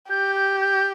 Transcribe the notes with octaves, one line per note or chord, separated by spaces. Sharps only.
G4 G6
G6
G6